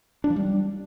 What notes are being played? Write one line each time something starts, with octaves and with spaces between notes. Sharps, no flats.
D4
F3
G3